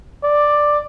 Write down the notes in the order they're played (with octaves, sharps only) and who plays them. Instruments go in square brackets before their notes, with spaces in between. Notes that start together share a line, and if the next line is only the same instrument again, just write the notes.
[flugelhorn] D5